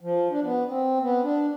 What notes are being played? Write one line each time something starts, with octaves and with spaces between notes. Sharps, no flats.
F3
D4
B3
C4
B3
D4